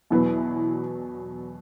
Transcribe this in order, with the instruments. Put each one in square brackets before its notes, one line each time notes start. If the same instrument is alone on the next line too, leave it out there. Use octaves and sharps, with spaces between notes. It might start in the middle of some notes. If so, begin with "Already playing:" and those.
[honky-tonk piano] E2 B2 F#3 B3 [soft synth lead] E4